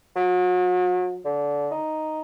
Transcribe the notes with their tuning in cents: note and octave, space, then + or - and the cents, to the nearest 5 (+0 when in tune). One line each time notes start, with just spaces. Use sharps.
F#3 -40
D3 -20
D#4 +0